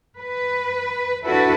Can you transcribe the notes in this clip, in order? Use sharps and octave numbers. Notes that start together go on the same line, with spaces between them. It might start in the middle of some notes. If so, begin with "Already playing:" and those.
B4
D4 E4 F#4 A4 B4